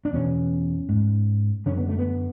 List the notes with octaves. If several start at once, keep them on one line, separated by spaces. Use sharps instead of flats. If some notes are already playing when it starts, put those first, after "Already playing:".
D4
E2 B2 C#4
G#2
F#2 D3 C#4
B3
A3
B3